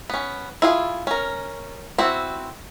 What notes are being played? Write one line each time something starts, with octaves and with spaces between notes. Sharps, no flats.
B3 C#4
E4 F4 G#4
C#4 A#4
C4 E4 F#4